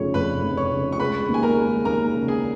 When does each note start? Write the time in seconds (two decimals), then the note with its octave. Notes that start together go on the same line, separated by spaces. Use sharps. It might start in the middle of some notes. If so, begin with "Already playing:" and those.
Already playing: F1 F2 C#3 C#5 C#6
0.14 F1 B4 B5
0.43 F1
0.57 C#5 C#6
0.71 C#3
0.92 C#6
1.00 G#3 B4 B5
1.29 D#2
1.34 G#5
1.43 A#4 A#5
1.57 G#3
1.85 D#2 A#4 A#5
2.14 C#3
2.28 G#4 G#5